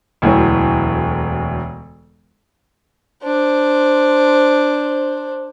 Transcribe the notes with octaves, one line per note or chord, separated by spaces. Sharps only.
E1 D2 E3 F#3
D4 C5